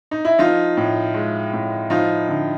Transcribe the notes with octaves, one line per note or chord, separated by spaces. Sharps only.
D#4
E4
F3 D#4 F4
A2
G#3
A2
F3 D#4 F4
D3